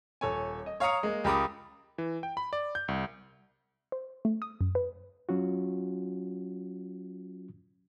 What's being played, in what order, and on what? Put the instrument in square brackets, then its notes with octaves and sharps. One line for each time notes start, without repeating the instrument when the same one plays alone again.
[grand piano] D#1 A4 C#5 G#5
D#5
C#5 F5 A#5 D#6 C#7
G#3 A#3
C#2 G4 A#4 B5 D6 D#6
[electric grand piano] E3
G5
B5
D5
G6
C2
[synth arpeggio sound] C5
A3
D#6
F#2
B4
[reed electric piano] F#3 C#4 F4 F#4